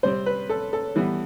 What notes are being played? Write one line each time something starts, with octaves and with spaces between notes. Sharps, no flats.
C3 G3 C4 C5
B4
A4
A4
E3 G3 B3